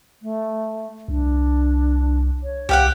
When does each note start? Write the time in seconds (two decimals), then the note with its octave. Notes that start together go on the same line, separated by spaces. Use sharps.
0.22 A3
1.08 C2 D4
2.43 C#5
2.69 C2 G4 F5 F#5